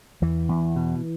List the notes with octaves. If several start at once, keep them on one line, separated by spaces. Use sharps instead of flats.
E2 E3
E2
B2